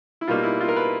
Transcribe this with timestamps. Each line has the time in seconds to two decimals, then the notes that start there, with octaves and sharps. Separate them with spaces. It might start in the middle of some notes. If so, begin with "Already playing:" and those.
0.21 E4
0.27 B2 G3 A#3 D#4 F4
0.43 E4
0.61 F4
0.68 A#4
0.76 B4